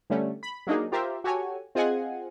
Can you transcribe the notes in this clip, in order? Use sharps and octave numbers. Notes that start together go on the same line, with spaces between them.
D3 G3 A3 C#4
B5
F#3 A#3 D4 D#4 G#4
F4 G4 A#4 C5 E5
F#4 G4 A4 C#5 G#5
C4 F4 G#4 D#5 F#5 G#5